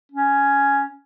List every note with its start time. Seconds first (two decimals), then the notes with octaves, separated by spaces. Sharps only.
0.12 C#4